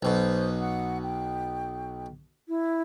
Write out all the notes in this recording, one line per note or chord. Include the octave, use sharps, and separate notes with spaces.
B1 B2 C5
F#5
G5
E4